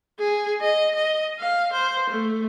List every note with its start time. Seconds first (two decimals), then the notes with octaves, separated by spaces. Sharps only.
0.19 G#4
0.61 D#5
0.95 D#5
1.40 F5
1.72 C5
2.10 A3